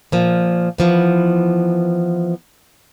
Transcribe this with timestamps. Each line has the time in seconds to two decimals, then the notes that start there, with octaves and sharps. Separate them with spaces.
0.12 A#2 F3
0.78 E3 F3 B3